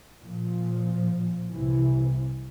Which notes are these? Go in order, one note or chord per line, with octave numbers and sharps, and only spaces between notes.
A#2 F3
C2 C3 E3